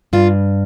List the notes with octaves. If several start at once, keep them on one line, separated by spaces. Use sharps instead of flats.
G2 F4